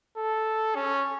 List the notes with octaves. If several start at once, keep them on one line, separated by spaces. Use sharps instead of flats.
A4
C#4